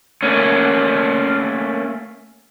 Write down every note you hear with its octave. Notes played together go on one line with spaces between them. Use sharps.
A3 A#3 C#4